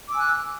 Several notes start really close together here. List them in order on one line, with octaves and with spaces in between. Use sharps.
D6 E6 G#5 F#6